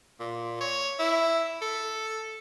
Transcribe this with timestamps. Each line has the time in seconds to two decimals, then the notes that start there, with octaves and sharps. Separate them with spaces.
0.20 A#2
0.61 C#5
0.99 E4
1.62 A4